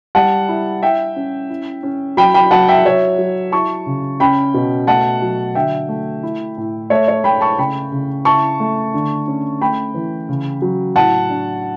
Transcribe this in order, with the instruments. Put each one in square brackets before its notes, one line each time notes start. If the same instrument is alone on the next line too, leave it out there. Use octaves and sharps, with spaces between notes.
[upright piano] G3 F#5 A5
E4
E4 E5 G5
C#4
E4
C#4
F#3 G5 B5
G5 B5
F#3 F#5 A5
E5 G5
F#3 C#5 E5
F#3
E4 A5 C#6
C#3
C#4 G5 B5
B2
A3 F#5 A5
F#3
D3 E5 G5
A3
E4
A2
A3 C#5 E5
C#5
A3 G5 B5
A5 C#6
C#3 G5 B5
C#3
E4 A5 C#6
A3
D3
C#4
A3 G5 B5
E3
C#3
F#3
A2 F#5 A5
D4